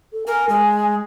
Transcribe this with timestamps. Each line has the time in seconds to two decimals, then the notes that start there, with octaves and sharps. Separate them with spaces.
0.13 A4
0.27 A#4 G#5
0.49 G#3